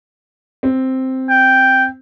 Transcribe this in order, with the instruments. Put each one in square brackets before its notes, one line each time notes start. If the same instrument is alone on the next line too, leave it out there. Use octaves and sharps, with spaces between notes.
[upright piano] C4
[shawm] G5